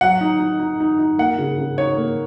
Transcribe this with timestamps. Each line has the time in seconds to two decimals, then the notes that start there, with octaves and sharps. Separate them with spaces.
0.01 F#3 F#5
0.21 D#4
0.40 D#4
0.60 D#4
0.80 D#4
0.99 D#4
1.18 A#3 F#5
1.38 C#3
1.58 C#3
1.77 D#4 C#5
1.97 A#3